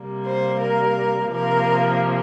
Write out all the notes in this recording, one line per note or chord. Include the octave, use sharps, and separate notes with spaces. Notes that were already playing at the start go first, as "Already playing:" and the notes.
Already playing: C3 G3 A#3
C5
A#4
C3 F3 A#3 A#4